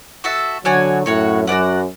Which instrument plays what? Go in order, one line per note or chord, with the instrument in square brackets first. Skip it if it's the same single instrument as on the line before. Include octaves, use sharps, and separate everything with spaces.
[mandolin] F#4 A4 E5
[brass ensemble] D3 F#3 [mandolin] D4 F#4 C#5 G#5
[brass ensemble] F#2 A2 [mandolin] F#4 C#5 F#5
[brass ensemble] F#2 [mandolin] F#4 B4 D5 F#5